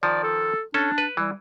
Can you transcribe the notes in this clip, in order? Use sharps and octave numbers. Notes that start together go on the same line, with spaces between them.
D#3 F3 D5
A4
C#4 D4 A4
B4
E3 G3